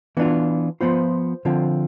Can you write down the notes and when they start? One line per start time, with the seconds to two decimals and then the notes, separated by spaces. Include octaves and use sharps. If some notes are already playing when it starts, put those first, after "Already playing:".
0.17 E3 B3 D4 F4
0.81 F3 B3 F4 C5
1.45 D3 F3 C4 F4